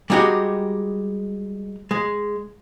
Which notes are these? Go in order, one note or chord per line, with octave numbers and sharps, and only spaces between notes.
G3 G#3 D#4 F#4 G4
G#3